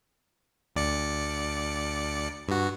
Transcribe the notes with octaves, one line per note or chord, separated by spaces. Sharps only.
D2 D5 C#7
G2 F#4